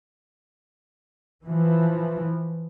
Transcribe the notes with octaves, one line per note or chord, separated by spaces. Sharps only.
E3 F3